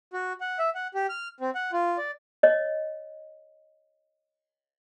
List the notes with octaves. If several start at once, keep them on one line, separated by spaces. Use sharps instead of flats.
F#4
F#5
E5
F#5
G4
F6
C4
F#5
F4
D5
C#5 D#5